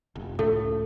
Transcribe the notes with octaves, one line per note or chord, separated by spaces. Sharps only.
F1
C#2 A2 A3 A4